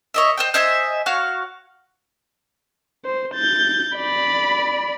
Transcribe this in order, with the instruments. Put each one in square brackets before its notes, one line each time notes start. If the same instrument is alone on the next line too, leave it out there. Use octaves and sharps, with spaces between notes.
[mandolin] C#5 D#5 E5
C5 D#5 G5
C5 D#5 E5 G#5
F#4 C#5 F5
[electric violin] C5
G6 A6
D5 B5